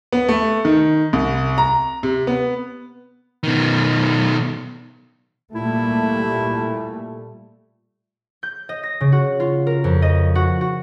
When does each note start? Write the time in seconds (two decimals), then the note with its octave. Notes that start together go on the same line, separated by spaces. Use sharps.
0.12 B3
0.29 A3
0.65 D#3
1.13 C2
1.58 A#5
2.03 C3
2.27 B3
3.43 B2 D#3
5.55 A#2 G3 A3 E4
8.43 G6
8.69 D#5
8.83 A#6
9.01 C#3
9.12 F#4
9.40 F4
9.67 A#4
9.84 F2
10.02 D#5
10.35 F#4
10.61 F#4